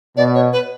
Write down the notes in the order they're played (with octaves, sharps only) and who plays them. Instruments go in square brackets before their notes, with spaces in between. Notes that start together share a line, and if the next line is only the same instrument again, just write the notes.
[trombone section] B2 [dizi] D5
[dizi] C#5
B4